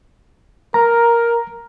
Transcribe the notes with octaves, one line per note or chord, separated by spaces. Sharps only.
A#4 A#5